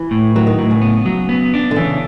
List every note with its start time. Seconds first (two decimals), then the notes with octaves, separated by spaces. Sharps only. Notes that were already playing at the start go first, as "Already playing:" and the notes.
Already playing: E3
0.11 A2
0.36 D#3 F#3
0.46 D#3
0.59 A2
0.71 C#3
0.82 B3
1.06 F#3
1.29 B3
1.54 D4
1.71 D3
1.76 C#3 E3